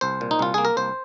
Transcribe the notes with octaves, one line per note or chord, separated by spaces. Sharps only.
C2 C5
A#2
D#4
C2 F4
A#3 G#4
A#4
C2 C5